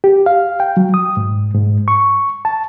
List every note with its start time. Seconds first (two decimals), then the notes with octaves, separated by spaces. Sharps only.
0.04 G4
0.26 F5
0.60 G5
0.77 F#3
0.94 D#6
1.17 G#2
1.55 G#2
1.88 C#6
2.45 A5